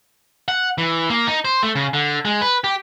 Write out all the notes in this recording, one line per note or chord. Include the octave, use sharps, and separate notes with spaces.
F#5
E3
A#3
D#4
C5
A3
C#3
D3
G#3
B4
G4